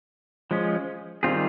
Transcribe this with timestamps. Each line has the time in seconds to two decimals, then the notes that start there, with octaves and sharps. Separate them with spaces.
0.51 F3 G#3 C#4
1.23 D#3 G3 C4 F4 G#4